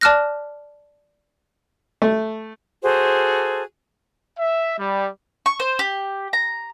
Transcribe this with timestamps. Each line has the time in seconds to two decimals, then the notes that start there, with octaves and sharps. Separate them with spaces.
0.01 D5 A5 D6 F6 F#6 A#6
2.02 A3
2.82 F#4 G#4 A4 C5
4.38 E5
4.78 G3
5.46 C#6
5.60 C5
5.79 G4
6.33 A#5